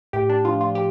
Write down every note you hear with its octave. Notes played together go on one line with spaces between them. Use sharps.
A2 G4
D4
F3 F4
F4
G4